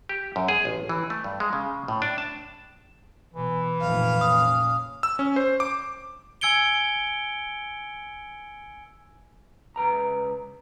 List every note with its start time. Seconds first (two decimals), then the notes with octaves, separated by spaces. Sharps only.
0.09 G4
0.36 F#2
0.48 G#4
0.65 A1
0.89 E3
1.10 A3
1.24 G2
1.40 G#3
1.53 C#3
1.88 A2
2.02 D4
2.18 A5
3.34 B2 E3
3.81 F1 A#2 F5
4.21 A#2 C#4 D#6
5.03 E6
5.19 C#4
5.36 C5
5.60 D6
6.41 G#5 E6 G#6 C#7 D7 G7
9.76 C#2 B4 A#5